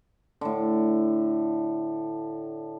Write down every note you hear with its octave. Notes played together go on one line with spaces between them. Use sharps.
A2 D3